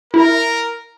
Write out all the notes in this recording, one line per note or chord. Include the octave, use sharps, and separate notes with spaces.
E4 A#4